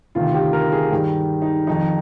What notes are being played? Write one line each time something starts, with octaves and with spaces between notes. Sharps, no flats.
D2 C3 D#3 F4
G4
A#4
G#4
G2 D#3 G4
D#4
F2 D#3 D#4